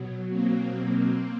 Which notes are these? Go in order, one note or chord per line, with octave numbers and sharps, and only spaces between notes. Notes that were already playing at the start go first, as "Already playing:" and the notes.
Already playing: B2 F#3
A#3 C4